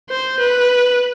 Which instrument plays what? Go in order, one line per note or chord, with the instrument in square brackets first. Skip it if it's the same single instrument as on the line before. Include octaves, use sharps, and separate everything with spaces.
[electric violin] C5
B4